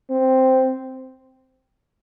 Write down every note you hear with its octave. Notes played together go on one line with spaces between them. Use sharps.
C4